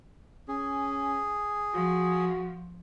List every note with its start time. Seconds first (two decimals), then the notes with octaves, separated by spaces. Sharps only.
0.48 C#4 G#4
1.74 F3 F#4